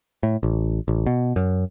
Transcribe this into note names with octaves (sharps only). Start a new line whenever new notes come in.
A2
A1
A1
B2
F#2